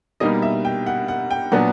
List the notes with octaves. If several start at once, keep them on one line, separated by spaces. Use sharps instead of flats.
B2 G3 A#3 D#4 D#5
E5
G5
F#5
F#5
G5
A#2 F#3 B3 D4 F#5